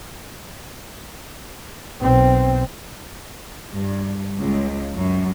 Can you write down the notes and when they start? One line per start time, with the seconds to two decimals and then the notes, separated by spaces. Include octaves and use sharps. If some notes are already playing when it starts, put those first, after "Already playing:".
2.00 B1 C4
3.75 G2
4.41 C#2
4.94 F#2